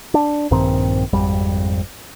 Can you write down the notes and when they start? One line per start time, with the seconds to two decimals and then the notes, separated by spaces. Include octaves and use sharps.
0.14 D4
0.51 A#1 G2 D#3 C4
1.13 G#1 F2 G3